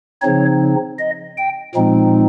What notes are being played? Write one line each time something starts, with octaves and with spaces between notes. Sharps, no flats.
C#3 F3 C4 D#4 C#5
D#5
G5
A#2 F3 G#3 C4 D#4